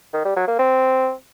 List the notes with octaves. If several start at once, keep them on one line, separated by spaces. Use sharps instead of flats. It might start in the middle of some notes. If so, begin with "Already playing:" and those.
D#3
G3
F#3
A#3
C4